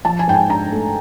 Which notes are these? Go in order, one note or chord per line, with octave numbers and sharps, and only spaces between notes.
F3 A5
G#5
G#2 G5
G#5
D4 A#5
A3